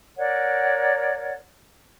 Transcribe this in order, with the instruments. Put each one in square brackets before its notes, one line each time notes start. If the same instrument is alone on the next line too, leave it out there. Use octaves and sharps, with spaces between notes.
[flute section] A#4 C#5 D5 F#5